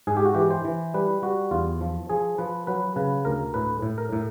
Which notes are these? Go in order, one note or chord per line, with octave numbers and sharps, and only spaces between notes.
G#2 G#4
G4
F#4
E3 G4
C5
E3
G3 B4
G3 F#4
E2 F4
F3
F3 G#4
F3 B4
F#3 B4
C#3 B4
D2 A#4
A2 B4
A2
A#4
A2